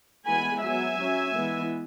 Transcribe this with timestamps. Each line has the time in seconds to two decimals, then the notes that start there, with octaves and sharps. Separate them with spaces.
0.26 E3 G#3 B3 G#5 B5
0.62 F#3 B3 E5 G#5
0.98 F#3 C#4
1.34 E3 G#3 B3